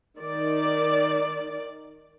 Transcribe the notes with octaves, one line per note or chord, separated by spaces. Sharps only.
D#3 D5